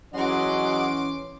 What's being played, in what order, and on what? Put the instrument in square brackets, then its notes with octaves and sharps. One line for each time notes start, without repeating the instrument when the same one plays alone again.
[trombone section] E3 C#4 [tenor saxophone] F#3 [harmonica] G#3 D#5 F#5 [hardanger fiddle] C6 D6